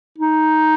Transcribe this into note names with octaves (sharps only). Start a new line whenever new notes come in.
D#4